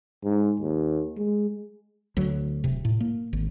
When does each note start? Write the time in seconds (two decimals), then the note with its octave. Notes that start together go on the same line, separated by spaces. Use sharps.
0.25 G#2
0.60 D#2
1.17 G#3
2.17 D2 F#3
2.64 D1 C3
2.85 A2
3.01 A#3
3.33 G#1